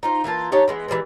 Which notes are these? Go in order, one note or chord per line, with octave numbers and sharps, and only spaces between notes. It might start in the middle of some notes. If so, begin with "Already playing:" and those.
D#4 F4 C5
E3 A#3 F4 A5
D#4 G4 C#5 A5
E3 G#3 B3
E3 F3 G3 G#3